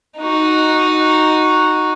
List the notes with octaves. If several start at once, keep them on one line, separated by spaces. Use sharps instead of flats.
D#4 F#4